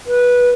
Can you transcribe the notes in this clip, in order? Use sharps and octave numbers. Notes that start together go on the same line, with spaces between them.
B4